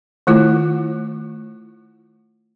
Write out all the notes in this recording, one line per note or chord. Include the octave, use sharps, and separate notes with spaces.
D#3 A3 E4 F4